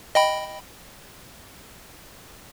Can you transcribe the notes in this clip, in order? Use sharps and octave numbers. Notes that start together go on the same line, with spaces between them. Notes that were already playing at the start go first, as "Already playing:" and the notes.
D#5 G5 B5